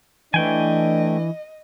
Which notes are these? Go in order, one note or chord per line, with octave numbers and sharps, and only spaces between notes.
E3 A3 D4 D#5 G5 G#5